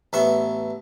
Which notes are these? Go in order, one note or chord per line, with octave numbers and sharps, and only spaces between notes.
A1 B3 E5 C#6